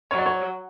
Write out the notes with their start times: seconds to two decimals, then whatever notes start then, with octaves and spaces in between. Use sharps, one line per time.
0.11 F#3 C#5
0.18 D5
0.26 C#5